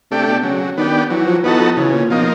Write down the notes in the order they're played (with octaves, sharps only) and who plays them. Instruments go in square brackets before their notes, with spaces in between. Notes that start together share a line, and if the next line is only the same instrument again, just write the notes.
[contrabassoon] C3 [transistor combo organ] A3 D4 G4
[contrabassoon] B2
[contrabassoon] C#3 [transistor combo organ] F#3
[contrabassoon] D#3 [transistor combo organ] B3 D4 G4
[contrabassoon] E3 [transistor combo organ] F#3
[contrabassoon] F3
[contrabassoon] E3 [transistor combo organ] B3 D#4 F#4 A4
[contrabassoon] F3
[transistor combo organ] C#3 [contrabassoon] E3
[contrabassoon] A#2
[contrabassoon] B2 [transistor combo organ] F3 A#3 D#4